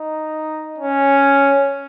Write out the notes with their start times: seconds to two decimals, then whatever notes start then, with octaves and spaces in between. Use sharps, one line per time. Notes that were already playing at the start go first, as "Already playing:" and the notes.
Already playing: D#4
0.78 C#4